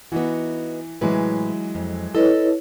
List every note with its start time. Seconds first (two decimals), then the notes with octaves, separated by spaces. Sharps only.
0.12 E3 B3 D#4 F#4
1.01 A2 C3 E3 F#3 G#3 B4
1.75 F2
2.15 E4 A4 B4 C#5 D#5